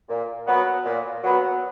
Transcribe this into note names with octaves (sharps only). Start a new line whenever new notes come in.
A#2
F#3 B3
A#2
F#3 B3